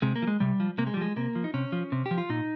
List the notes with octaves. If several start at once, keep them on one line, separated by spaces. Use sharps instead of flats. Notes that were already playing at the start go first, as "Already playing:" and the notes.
C3 G#3
A#3
F3
G#3
C3 G3
F3
C3 A#3
G#3
G3
F3 G#3
C3 A#3
F3
D#4
C3 C#4
F3
C3
G4
F3
F4
A#2 D#4